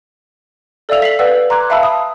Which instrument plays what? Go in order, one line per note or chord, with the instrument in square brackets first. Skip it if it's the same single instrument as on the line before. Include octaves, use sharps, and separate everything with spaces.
[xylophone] A4 D5 E5 F5 E6 F7
B6 C7 F#7
B4 D5 F5 F#5 E6
A#5 C6 D6 F#6 G#6
E5 F5 A5 B5 E6
D#6